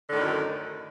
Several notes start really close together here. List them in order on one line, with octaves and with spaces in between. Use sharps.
D3 A2 D#3 F#2